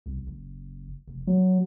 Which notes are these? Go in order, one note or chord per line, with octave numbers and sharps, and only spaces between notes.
C2
F#1
F1
F#3